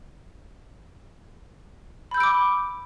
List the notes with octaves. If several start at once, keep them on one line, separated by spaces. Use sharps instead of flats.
B5 D6 E6 G6 D7